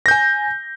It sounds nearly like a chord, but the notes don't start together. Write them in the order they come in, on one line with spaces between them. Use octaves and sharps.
A#6 G6 G#5